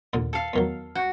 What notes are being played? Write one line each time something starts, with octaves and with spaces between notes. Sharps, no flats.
D#2 A#2 D3
A4 F5
E2 D#3 F#3
F#4